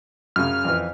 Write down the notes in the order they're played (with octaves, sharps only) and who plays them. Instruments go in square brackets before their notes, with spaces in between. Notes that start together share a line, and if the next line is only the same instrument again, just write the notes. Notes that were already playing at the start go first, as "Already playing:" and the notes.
[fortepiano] F#2 C#3 [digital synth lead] F6
[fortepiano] F2 E3